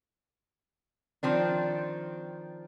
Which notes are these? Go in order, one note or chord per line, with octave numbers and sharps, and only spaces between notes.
D#3 F3 C4 D4